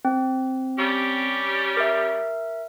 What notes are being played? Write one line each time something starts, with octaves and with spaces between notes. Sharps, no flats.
C4
G3 C#4 G4
A#4 E5